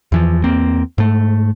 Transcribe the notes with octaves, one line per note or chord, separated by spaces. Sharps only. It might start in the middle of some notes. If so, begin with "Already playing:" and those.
E2 E3 F3
E2 A#3 C4
G#2 A3